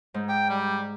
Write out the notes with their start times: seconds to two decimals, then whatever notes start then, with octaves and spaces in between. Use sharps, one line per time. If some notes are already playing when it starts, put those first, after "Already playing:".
0.14 G#2
0.29 G5
0.50 G3